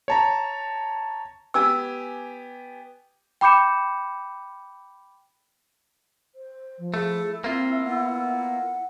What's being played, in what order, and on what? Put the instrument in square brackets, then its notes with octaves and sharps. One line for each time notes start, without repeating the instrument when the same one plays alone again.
[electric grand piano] C#5 A5 A#5
[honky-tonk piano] B3 G4 G#5 [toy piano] E6
[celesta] G5 B5 D6 G6 C#7 E7
[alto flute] C5
[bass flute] F3
[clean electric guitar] A3 [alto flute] E4 [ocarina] G#4
[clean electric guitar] A#3 F4 [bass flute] C4 [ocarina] E5
[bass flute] B3 [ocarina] F#5